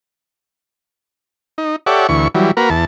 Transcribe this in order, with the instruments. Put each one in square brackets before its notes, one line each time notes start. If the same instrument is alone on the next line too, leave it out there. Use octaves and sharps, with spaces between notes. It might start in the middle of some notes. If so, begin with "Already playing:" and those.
[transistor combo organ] D#4
G4 A4 C#5 D5 E5 F#5
D2 E3 C#6
E3 F#3 G3
A#3 F#4 A#4 B4
E2 A5